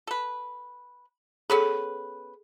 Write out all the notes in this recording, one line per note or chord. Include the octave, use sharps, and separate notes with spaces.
A4 B4
B3 C#4 G#4 A4 B4